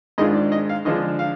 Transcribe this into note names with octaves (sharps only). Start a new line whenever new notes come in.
G#2 D#3 G#3 D4 F4 D#5
D5
D#5
F5
D3 F3 G#3 D4 D#5
F5